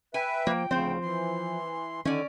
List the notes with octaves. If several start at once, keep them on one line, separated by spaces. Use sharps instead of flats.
B4 E5 G5 G#5
F3 A#3
D2 C#3 F3 C4 C5
E3 C6
D3 D#3 C#4 D5 G#5